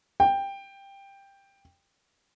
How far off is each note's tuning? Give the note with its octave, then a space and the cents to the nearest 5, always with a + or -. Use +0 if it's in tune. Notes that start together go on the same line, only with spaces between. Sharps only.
G5 +10